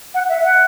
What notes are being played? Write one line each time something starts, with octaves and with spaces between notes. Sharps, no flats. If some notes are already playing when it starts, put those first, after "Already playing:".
F#5
E5
F#5